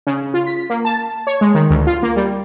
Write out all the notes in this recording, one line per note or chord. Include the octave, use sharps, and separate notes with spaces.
C#3
F4
B6
A#3
A5
C#5
G#3
D#3
D2
F4
A#3
G3